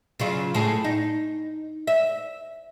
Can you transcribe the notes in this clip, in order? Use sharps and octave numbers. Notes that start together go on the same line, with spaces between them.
C#3 F#3 F4
A2 G#4
D#4
E5